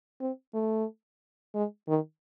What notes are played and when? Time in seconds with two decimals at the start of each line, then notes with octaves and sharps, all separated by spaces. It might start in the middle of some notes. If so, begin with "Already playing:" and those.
0.21 C4
0.54 A3
1.55 G#3
1.88 D#3